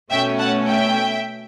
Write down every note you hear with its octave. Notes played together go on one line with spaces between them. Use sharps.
B2 A3 C#4 E5 G5
F#5 A5
E5 G5